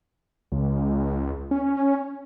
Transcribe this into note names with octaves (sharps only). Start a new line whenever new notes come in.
C#2
C#4